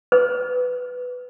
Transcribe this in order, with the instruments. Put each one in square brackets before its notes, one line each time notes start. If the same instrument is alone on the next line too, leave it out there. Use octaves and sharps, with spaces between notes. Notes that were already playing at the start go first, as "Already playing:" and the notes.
[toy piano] B4